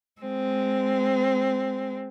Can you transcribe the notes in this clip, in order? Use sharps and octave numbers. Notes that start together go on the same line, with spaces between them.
G#3 C4